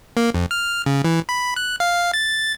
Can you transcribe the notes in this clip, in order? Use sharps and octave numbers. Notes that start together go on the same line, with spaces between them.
A#3
F2
F6
C#3
E3
B5
F#6
F5
A6